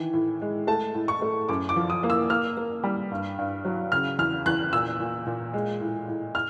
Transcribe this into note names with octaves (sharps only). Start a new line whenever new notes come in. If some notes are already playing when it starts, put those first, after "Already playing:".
Already playing: D#3 E3
A2
G#3
A3 A5
A2
C#6
A3
F#2 D6
D6
F3
D#6
A#3
E6
A#3 F6
A#3
G3
G2
G2
F#3
C#3 F6
E2 F6
E2 F#6
A#2 E6
A#2
A#2
G#3
A2
A2
F6